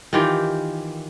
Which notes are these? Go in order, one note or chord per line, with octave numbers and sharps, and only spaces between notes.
D#3 E3 F4 G4